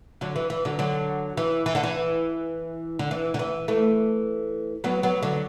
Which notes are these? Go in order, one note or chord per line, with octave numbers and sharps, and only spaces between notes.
D3 F#3
E3
E3
D3 F#3
D3 F#3
E3
E3
D3
E3
D3
E3
D3
E3
E3 A3
F#3 B3
F#3 B3
D3 F#3